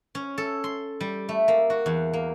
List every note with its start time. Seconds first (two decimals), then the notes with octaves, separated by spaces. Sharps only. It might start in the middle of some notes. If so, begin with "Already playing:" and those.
0.15 C#4
0.38 A4
0.64 C6
1.01 G3
1.29 A3
1.48 A#3
1.70 F#4
1.86 E2
2.13 A#3